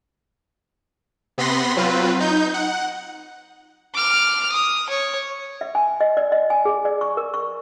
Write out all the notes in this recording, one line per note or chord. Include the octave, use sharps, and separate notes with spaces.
C3 B3 B5 C6 A#6
F#3 C4 F4 B4
D#4 G6
F#5
D6 F6
D#6
C#5
E5
G#5
D#5
D5
D#5
G#5
G#4
D5
C#6
A#4
C#6